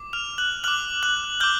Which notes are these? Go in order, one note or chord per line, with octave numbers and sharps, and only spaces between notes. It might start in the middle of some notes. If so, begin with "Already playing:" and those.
Already playing: D6
F6 F7
F#6 F#7
D6 F6 F#6 F#7
F#6 F#7
D6 F6 G6 G7